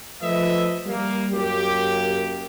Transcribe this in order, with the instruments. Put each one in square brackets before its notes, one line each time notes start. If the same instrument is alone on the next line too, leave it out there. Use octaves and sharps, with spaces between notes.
[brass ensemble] F3 A3 B4 D#5 E5
G3 A#3
F#2 A#3 G4